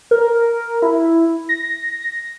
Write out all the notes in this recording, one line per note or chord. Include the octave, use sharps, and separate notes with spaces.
A#4
E4
A#6